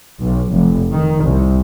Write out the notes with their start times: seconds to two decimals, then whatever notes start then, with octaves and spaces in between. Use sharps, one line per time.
0.21 B1
0.52 F1
0.93 D#3
1.23 C2